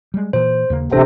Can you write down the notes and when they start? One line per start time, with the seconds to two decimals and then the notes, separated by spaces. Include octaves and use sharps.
0.14 G3 G#3
0.33 A#2 E3 C5
0.70 D#2 C#3 A#3
0.92 D1 A1 C3 E3 D4 A4 C5